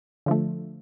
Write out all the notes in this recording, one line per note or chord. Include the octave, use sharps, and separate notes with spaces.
D3 F3 A3